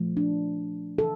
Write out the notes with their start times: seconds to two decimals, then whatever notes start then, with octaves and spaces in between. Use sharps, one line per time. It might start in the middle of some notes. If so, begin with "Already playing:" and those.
Already playing: A#2 F3 A3
0.17 D4
0.98 C#3 E3 A4